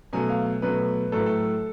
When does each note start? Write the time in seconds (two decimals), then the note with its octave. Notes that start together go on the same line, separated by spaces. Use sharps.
0.13 B2 F#3 A3 G#5
0.30 F5
0.62 B2 F#3 A3 B4
1.12 A2 F#3 A3 A4
1.19 B4
1.26 A4